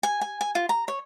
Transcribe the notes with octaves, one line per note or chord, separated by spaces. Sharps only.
G#5
G#5
G#5
F4
A#5
C#5